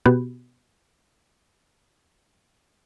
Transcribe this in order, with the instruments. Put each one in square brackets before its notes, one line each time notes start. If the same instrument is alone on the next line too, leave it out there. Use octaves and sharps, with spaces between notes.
[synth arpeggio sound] B2 B3 F#4 G4